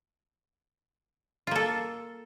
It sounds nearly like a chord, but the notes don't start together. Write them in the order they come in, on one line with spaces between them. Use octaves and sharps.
F4 A#3 A4